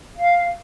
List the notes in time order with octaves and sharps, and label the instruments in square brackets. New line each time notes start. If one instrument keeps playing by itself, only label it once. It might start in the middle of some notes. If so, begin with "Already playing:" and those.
[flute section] F5